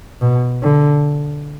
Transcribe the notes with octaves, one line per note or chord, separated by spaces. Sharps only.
B2
D3